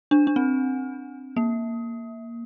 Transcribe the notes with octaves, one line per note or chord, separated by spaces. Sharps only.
D4
D4
C4
A#3